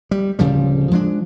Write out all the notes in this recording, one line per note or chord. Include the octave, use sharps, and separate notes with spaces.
G3
D1 C#3 F3 G3
F3 G#3 C#4 D4